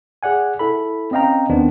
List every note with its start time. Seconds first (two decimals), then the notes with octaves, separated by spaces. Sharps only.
0.23 G#4 D5 F#5 G#5
0.59 E4 A4 B5
1.11 C4 C#4 D#5 F5 G5 A#5
1.49 D#2 D#3 B3 C4 D4